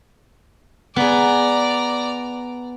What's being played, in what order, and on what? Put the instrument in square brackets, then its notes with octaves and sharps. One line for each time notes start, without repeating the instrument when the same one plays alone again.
[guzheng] B3 G#4 [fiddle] D5 A#5